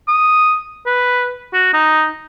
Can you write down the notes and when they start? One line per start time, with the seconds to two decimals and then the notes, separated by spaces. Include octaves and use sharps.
0.08 D#6
0.86 B4
1.53 F#4
1.73 D#4